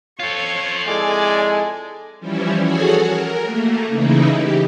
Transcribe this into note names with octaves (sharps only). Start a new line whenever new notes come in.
F4 A4 C#5
F2 G#3 E4 A4 D5 G#5
E3 F3 G3 C#4 E4
F#4 G#4 A4 C#5 F#5 G#5
A#4
A3 A#3
C#3 E3 D#4 E4
G4